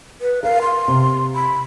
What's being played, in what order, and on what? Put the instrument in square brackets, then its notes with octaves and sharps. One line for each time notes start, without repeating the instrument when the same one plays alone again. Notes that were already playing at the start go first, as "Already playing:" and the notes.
[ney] B4
[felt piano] A#4 [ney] F5
[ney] C6
[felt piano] C3
[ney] B5